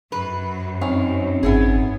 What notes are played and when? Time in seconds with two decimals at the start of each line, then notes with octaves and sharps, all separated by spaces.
0.12 F#2 B4
0.81 C4 C#4 D#4 F5
1.43 G#1 B3 E4 G#4